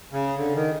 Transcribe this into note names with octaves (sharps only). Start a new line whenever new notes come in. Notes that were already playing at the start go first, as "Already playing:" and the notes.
C#3
D3
D#3